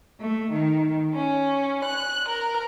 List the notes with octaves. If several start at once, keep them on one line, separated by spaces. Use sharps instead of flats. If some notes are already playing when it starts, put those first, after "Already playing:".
A3
D#3
C#4
F#6
A#4